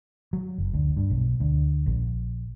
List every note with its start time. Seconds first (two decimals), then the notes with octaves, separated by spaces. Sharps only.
0.33 F#3
0.58 F#1
0.74 D2
0.97 G2
1.10 B1
1.40 D2
1.86 A#1